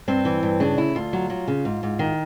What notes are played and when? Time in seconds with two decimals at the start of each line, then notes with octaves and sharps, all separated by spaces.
0.08 G2 C4
0.25 E3
0.43 G2
0.60 C#3 D4
0.78 D2 E4
0.95 D2 F4
1.13 F#3
1.30 F#3
1.48 C#3
1.65 G#2
1.83 G#2
1.99 D#3